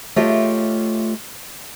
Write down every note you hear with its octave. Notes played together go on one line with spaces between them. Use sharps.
A3 F4 G4 C#5 D#5 E5